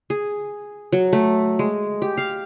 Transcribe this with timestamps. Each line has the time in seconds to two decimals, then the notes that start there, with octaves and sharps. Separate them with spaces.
0.10 G#4
0.93 F#3
1.13 A3
1.59 G#3
2.02 G4
2.17 F5